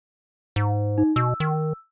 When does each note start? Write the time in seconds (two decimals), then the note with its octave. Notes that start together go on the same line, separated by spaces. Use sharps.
0.56 G#2
0.98 D#4
1.16 B2 E6
1.40 D#3